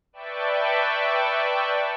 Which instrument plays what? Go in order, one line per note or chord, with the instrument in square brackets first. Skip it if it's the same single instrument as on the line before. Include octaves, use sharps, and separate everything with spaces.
[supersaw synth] B4 D5 E5 G5 A5 C#6